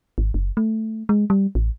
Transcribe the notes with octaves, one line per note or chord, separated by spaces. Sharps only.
G#1
F#1
A3
G#3
G3
A1